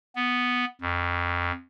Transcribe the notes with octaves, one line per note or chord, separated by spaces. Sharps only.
B3
F2